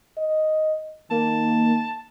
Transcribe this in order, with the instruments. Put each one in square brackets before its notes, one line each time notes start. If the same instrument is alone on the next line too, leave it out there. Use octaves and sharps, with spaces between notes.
[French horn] D#5
[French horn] D#3 [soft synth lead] A#3 [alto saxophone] A5